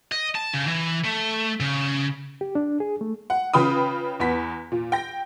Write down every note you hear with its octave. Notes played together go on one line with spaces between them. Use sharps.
D#5
A5
C#3
E3
A3
C#3
G4
D4
G#4
A3
F#5
C#3 F4 B4 G5 B5 D#6
E2 B3 B6
A#2
G5 A#6